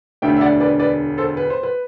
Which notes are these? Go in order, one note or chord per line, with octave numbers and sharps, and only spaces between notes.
E1 D2 D3 E5 G5
E5
D5 F#5
B4 D5
B4 D5
A4 C5
B4
C5
B4